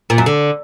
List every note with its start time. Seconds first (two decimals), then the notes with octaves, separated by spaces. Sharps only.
0.10 A#2
0.18 F#2
0.26 D3